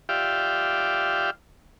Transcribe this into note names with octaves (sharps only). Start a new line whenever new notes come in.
F4 G4 D5 E5 F5 G5